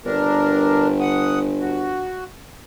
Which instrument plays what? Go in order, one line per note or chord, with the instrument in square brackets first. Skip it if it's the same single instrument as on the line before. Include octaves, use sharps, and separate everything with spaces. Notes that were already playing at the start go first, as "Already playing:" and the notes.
[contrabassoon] G1 [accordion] D4 A#4
[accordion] F#5 D#6
F#4